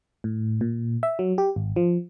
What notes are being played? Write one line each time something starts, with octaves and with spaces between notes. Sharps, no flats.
A2
A#2
E5
F#3
G4
G#1
F3